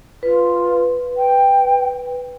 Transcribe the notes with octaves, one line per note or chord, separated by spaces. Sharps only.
F4 B4
G5